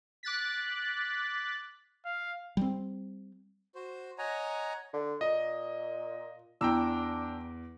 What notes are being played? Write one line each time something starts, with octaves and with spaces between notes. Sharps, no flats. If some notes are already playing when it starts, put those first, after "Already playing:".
D6 F#6 A6 B6
F5
G3 C4
F#4 C5
C#5 D#5 F#5 G#5 A#5
D3
A#2 D#5
E2 D4 G5 A#5 E6